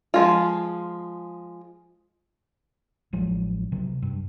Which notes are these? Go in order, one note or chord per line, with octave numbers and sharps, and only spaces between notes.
F3 G#3 F4
A1 F3 F#3 G#3
C3 F#3
G2